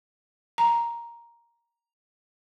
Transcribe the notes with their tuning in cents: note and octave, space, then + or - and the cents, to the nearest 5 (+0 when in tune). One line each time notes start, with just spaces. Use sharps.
A#5 +5